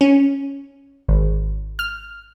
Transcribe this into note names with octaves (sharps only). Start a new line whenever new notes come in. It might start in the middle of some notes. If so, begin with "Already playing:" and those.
C#4
G#1
F6